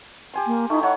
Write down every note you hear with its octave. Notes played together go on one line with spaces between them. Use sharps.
G4 G#5 C6
A#3
A3 D#4 E4
D#4 C#5 F#5